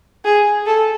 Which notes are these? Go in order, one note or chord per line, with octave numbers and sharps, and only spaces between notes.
G#4
A4